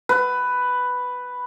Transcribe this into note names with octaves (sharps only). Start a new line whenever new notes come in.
B4